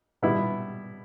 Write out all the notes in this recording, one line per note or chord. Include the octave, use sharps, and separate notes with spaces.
B2 G3 B3 E4